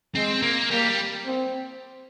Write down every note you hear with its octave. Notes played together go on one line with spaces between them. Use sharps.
G#3 C4
A#3
G3 A#3
C4